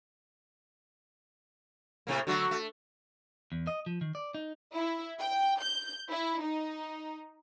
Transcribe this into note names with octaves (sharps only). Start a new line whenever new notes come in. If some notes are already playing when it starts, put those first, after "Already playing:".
A2 C3 A#3
D3 F#3 A3 F#4
A3
E2
D#5
F3
D#3
D5
D#4
E4
G5
G6
E4
D#4